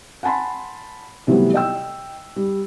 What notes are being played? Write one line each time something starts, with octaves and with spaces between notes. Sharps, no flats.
F#5 G#5 A5 B5 C6
C3 E3 F#3 G3 A3 B3
D#5 G5 E6
G3